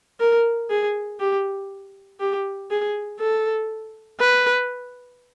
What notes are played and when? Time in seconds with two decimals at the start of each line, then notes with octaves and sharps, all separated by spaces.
0.20 A#4
0.70 G#4
1.20 G4
2.20 G4
2.70 G#4
3.20 A4
4.20 B4